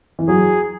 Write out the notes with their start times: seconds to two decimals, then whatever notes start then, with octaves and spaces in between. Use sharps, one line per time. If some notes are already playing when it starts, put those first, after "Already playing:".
0.19 E3
0.28 F#3 G#4